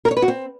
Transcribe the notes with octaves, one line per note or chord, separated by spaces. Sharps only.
A#4
C#5
B4
F#4
C4